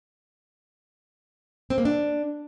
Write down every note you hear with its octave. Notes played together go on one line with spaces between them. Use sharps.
C4
A#3
D4